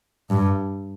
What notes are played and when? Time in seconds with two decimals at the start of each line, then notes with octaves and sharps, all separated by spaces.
0.30 G2